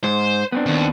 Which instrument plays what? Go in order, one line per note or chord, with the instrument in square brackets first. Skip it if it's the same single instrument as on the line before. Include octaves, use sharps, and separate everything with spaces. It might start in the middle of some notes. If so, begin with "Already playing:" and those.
[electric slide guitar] G#2 [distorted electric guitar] C5
[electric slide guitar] B3 C4 D4
[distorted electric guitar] D#2